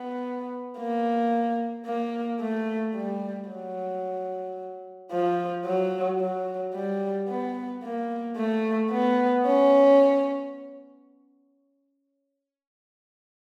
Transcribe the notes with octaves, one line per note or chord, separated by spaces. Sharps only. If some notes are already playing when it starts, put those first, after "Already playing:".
Already playing: B3
A#3
A#3
A3
G3
F#3
F3
F#3
F#3
G3
B3
A#3
A3
B3
C#4